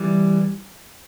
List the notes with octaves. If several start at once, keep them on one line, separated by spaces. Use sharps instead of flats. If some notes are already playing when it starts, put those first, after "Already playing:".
Already playing: E3 G3